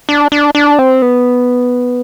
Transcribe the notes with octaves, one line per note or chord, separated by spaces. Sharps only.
D4
D4
D4
C4
B3